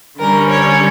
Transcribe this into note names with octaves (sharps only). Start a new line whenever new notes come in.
D3 G3 C#4 A#4
C#5